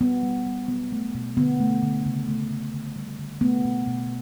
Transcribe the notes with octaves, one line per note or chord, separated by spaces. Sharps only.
G3 B3
G3
G3
F#3 B3
A3
B2
D3 B3
A3
D3
C#3
A3
C#3
D3
G3
D3
A3 B3
B2
B2